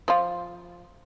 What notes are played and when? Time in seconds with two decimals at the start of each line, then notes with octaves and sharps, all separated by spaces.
0.08 F3 F4